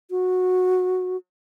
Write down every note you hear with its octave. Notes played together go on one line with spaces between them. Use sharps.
F#4